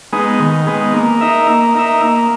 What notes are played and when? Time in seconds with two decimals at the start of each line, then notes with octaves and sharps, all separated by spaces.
0.13 G#3 B3 D#4
0.39 D#3
0.67 G#3 B3 D#4
0.94 A#3
1.21 D#4 A#4 E5
1.47 A#3
1.75 D#4 A#4 E5
2.01 A#3